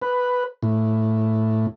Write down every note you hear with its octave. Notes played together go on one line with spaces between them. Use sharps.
B4
A2